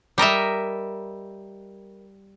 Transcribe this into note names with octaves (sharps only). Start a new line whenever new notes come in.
G3 A#4 D#5 E5